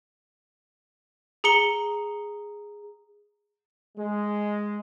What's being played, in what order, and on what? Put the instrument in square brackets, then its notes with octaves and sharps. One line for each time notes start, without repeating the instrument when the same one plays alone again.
[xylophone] G#4 A#5 C#7 G7
[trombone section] G#3